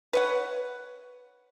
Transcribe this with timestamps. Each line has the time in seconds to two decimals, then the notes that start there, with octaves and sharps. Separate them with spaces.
0.13 B4 C#5 F#5